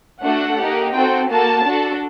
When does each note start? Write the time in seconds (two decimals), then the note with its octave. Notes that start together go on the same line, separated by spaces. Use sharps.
0.23 A3 D4 F#4 A4 F#5
0.58 A#3 D#4 G4
0.93 C4 F#4 A4 G5
1.30 A#3 F#4 A4 A5
1.65 D4 F#4 A4